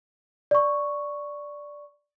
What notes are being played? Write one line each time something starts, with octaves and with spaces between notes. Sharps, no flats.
D5 C#6